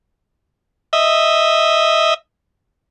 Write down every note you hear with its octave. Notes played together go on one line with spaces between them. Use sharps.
D#5 E5